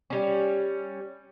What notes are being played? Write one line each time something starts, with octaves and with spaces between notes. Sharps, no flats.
G3 C#4